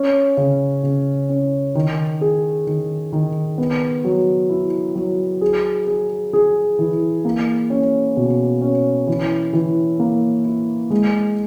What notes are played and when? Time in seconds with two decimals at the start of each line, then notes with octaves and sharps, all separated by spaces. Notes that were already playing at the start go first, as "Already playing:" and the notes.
Already playing: C#4
0.37 C#3
0.83 C#3
1.29 C#4
1.75 D#3
2.21 G#4
2.67 D#3
3.13 D#3
3.58 B3
4.04 F#3
4.49 E4
4.95 F#3
5.41 G#4
5.87 G#4
6.33 G#4
6.79 E3
7.25 A#3
7.70 C#4
8.17 B2
8.61 C#4
9.07 E3
9.53 E3
10.00 A#3
10.45 E4
10.90 G#3